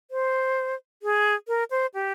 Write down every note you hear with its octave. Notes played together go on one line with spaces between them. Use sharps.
C5
G#4
A#4
C5
G4